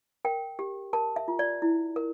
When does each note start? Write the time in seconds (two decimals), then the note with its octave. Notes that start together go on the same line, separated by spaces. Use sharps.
0.25 A#4 G5
0.59 G4
0.93 A#4 A5
1.16 E5
1.28 F4
1.39 D5
1.62 E4
1.96 A#4